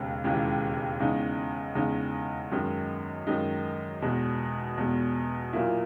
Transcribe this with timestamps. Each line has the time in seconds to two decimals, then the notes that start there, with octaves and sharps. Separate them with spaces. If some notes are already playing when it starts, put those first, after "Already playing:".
Already playing: E1 D#2 C#3 G#3
0.24 E1 D#2 C#3 E3 G#3
1.00 E2 C#3 G#3 D#4
1.75 E2 C#3 G#3 D#4
2.52 F#2 D#3 G#3 D#4
3.27 F#2 D#3 G#3 D#4
4.02 E2 B2 G#3
4.77 E2 B2 G#3
5.53 A#2 F#3 A#3 E4